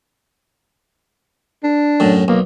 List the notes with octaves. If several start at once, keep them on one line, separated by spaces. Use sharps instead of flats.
D4
F#2 A2
B1 A#3